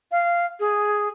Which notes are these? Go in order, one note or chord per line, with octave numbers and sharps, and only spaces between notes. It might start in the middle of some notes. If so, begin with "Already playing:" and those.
F5
G#4